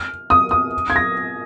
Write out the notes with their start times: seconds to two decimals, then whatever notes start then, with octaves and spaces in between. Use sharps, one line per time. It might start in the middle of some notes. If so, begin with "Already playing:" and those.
Already playing: F6
0.30 D#6
0.51 D#6
0.90 G#6
0.96 A#6